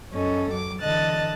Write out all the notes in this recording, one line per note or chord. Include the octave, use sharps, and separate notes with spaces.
F#2 C#4 A4 D#5
F#3 D6
D3 E3 D#5 A5 F#6 A6